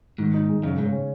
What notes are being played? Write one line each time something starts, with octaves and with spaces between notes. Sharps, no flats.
G#2 D#3
D#4
G#3
F#2 C#3
G#2 C#3
C#4